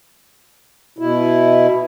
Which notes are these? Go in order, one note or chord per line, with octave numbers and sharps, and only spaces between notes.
B2 E4